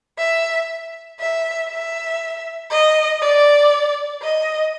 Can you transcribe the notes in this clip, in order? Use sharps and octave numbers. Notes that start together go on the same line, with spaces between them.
E5
E5
E5
D#5
D5
D#5